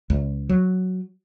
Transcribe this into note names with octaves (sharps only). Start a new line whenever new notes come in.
C#2
F#3